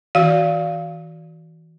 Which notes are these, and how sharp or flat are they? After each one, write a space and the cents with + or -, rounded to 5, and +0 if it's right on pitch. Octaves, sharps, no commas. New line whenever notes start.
E3 -35 F#4 +0 F5 -5